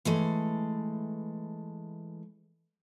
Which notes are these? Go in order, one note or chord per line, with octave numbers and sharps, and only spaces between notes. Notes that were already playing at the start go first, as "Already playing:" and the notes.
E3 G#3 A3